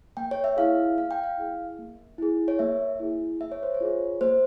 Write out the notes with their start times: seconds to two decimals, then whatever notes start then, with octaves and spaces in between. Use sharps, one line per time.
0.17 A#3 G5
0.31 C#5
0.44 E5
0.57 E4 G#4 F5
0.98 A#3 F5
1.11 G5
1.24 F5
1.38 E4 G#4
1.79 A#3
2.18 E4 G#4
2.48 C#5
2.59 A#3 E5
3.00 E4 G#4
3.40 A#3 E5
3.52 C#5
3.63 C5
3.75 C#5
3.81 F4 G#4
4.21 A#3 C5